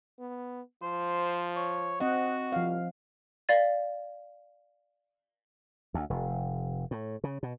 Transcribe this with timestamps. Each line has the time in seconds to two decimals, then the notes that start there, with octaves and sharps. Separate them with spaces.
0.19 B3
0.82 F3 C5
1.56 C#5
2.00 C4 F#4 D#5 F#5
2.52 C2 F3 F5
3.49 D5 F5 A6
5.94 D2
6.10 F1
6.91 A2
7.24 C#3
7.43 B2